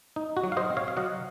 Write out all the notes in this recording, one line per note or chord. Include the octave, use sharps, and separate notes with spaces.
D#4
F#4
F#3
F5
C5 D#5
C4
C#5 F5
F5
F#3 D#5 F#5